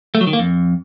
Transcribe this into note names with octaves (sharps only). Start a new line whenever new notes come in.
A3
F#3
D#3
A#3
F2